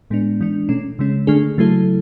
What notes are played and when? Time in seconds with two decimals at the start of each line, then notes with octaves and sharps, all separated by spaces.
0.10 A2 G#3 B3 D4
0.41 E3 G#3 D4
0.69 B2 A3 C#4
0.99 C#3 G#3 C#4
1.27 D3 A3 D4 G#4
1.58 C#3 F#3 A3 E4 A4